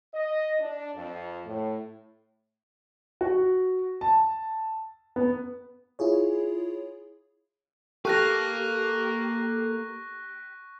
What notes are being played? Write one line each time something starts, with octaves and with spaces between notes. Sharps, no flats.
D#5
D4
F2
A2
F#4
A5
B3
E4 F4 G#4 C#5
A#3 G4 A4 F5 C#6 F#6 A#6